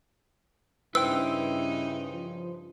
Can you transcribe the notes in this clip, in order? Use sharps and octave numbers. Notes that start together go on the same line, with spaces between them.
G2 C#3 D#4 E4 B4 C5 G5 E6
F3